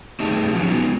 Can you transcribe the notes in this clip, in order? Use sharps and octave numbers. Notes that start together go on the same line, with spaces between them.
A3 D#4 G4 G#4 E5 A5
F3 F#3 C#4 F4 F#4 G#4
G#3 B3 D#4 F4